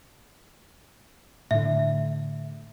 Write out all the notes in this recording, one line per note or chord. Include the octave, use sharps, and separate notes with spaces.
A2 D3 E5